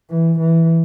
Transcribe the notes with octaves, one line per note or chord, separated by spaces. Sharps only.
E3
E3